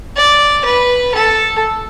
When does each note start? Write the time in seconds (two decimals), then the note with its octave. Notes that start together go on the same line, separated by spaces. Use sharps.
0.16 D5
0.65 B4
1.15 A4